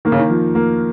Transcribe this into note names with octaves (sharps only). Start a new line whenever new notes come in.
D#3 A#3
C#3
D#3
F3
A#3